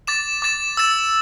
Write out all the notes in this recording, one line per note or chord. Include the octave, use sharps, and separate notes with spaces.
D6 A6 E7
D6 A6 E7
E6 A6 E7